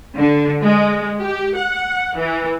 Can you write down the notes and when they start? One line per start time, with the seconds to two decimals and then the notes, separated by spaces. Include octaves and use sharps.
0.15 D3
0.61 G#3
1.21 G4
1.57 F#5
2.16 E3